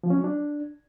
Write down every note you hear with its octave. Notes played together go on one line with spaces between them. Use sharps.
F3
C#4
F#3
D4